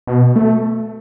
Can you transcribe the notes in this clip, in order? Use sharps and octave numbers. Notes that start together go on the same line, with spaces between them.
B2
A3